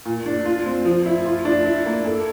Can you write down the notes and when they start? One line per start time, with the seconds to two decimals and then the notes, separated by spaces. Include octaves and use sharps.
0.05 A#2
0.26 D4
0.45 F4
0.66 C4
0.85 F3
1.06 E4
1.26 F4
1.45 D4
1.65 E4
1.86 A#3
2.05 A4